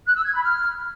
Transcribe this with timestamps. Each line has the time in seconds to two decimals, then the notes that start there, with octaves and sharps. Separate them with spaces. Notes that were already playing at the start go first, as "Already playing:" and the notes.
0.05 F#6
0.15 E6
0.24 G#6
0.33 B5
0.43 F6